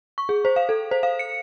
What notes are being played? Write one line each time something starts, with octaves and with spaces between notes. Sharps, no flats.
C#6
G#4
C5
F5
A4
C5
F5
C#7